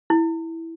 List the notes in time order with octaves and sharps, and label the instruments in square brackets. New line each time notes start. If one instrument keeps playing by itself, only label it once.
[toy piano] E4